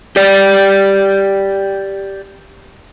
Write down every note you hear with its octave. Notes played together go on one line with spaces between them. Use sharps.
G4 D5